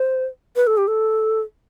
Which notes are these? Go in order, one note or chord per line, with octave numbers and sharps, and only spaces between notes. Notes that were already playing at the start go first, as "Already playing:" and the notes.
Already playing: C5
B4
A4
G4
A4